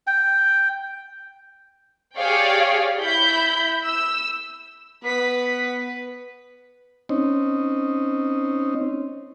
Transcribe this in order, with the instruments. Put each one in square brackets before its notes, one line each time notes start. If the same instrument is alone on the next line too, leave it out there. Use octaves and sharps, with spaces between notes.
[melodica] G5
[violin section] G4 G#4 C#5 D5 F5 G5
E4 B5 G6
E6
[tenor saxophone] B3 [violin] B4 [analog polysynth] B6
[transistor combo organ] C4 C#4 D#4